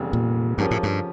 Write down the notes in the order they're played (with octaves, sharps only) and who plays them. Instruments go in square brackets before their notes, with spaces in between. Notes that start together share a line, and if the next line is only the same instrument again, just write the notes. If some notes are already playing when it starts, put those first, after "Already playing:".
Already playing: [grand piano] F1 E2 C#3 G3
[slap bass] A#2
[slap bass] G2 [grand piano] C#3 F3 C#4 G4 A#4
[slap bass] A2
G2